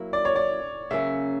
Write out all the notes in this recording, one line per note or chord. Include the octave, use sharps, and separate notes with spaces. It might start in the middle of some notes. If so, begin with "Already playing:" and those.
Already playing: F#3 A#3 E4
D5
C#5
D5
C#3 F#3 A#3 C#4 E5